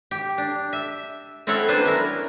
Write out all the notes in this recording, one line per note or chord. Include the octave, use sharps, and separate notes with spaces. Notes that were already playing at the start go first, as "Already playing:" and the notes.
G4
D4
E5
C4 C#4 E4 A4 C#5 F#5
F#3 B3 D4 B4 C5
C#4 E4 A#4